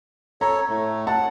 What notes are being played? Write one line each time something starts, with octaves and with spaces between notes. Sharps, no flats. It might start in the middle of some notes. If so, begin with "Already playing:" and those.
A4 C#5 A#5
A2 A3
F#5 A5